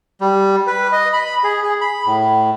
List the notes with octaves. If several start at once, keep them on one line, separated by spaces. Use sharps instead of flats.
G3
B4
D#5
B5
G#4
G#4
B5
A2